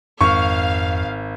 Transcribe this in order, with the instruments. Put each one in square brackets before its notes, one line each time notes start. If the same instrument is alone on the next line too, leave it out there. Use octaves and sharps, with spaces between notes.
[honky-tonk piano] G#1 [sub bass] F2 [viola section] F5 [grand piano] C#6